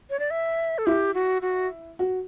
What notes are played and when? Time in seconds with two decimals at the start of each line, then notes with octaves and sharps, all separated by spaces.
0.10 C#5
0.19 D5
0.31 E5
0.78 A4
0.86 E4 G4
1.15 F#4
1.42 F#4
1.99 F#4